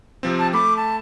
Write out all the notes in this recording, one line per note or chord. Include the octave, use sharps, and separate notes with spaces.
C3 F3 C4
A5
A3 B5 D6
A5